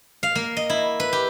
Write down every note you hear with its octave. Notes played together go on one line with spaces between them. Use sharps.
F5
A#3
D#5
E4
B4
G4